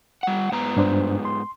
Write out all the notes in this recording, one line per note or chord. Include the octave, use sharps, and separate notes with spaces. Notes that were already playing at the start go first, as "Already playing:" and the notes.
G3 F#5
G#2 B3 A#5
G2 D4 C5
C6